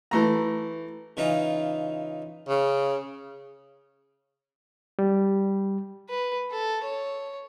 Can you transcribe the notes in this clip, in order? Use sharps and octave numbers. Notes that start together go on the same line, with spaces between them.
E3 A3 A#5
C#3 E3 D#4 F4
C#3
G3
B4
A4
C#5